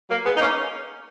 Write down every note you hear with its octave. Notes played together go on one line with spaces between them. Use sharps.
F#3 A#3
G#3 B3
D#4
A#3 C#4